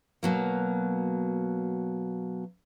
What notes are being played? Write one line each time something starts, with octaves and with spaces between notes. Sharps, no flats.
B2 F#3 A#3